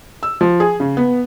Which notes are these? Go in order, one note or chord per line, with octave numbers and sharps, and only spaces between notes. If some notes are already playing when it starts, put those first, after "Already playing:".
E6
F3
G#4
C#3
B3